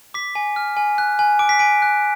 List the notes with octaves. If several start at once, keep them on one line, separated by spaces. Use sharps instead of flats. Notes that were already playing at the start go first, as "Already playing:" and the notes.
D6 B6
G#5
F6
G#5
F#6
G#5
D6 D7
B6
G#5 D7
F#6